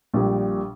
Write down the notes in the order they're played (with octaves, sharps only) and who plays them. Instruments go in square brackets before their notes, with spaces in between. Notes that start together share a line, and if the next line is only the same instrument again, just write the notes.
[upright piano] A#1 A#2 G3